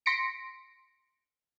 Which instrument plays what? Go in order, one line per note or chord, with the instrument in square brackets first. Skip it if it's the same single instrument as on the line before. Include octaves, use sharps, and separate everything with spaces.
[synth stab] C6 A#6 B6 C#7 D7